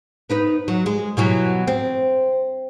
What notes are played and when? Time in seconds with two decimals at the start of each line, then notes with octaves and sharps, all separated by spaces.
0.30 B3 D#4 B4
0.68 F#3
0.86 G#3
1.17 B2 E3 F#3
1.67 C4